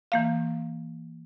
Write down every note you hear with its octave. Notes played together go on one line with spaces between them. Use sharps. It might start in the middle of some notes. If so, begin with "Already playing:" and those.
E3 A#3 F5